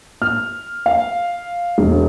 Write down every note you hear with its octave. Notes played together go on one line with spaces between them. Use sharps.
F6
F5
E1